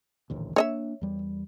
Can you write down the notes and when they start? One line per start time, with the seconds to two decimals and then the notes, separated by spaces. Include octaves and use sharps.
0.30 D#1 A1 D2
0.56 A#3 D4 C#5 D#5 E5
1.01 E2 G3